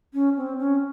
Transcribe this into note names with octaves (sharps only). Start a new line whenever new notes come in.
C#4
C4
C#4